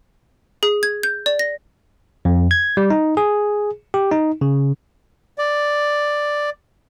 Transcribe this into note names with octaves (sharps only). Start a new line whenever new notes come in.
G#4
G#6
G6
D5
A#6
F2
G#6
G3
D#4
G#4
G4
D#4
C#3
D5